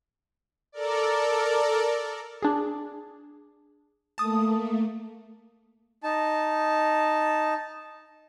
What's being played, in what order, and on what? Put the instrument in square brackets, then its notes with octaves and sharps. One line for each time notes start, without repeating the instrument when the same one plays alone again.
[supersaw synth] A4 A#4 D5
[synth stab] D4 G#4
[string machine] A3 A#3 [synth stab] A5 D#6
[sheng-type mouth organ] D#4 A5